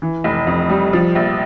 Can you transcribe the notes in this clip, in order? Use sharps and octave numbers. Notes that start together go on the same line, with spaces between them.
E3
F1
F2
G3
F3
A#1